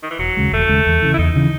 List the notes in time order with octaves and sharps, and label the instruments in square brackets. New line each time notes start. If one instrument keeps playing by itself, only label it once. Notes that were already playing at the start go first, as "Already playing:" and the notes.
[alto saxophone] D#3
E3
[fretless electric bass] E1 [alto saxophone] F#3
[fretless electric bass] D#2 C#3 G#3
[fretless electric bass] E1 [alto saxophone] A3
[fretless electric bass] D#2 C#3 G#3
E2
C#3 E3
[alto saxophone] E4
[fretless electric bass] E2 [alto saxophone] D#4
[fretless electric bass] C#3 E3